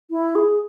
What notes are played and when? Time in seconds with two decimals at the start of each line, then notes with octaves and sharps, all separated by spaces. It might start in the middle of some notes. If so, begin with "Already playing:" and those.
0.11 E4
0.35 G#4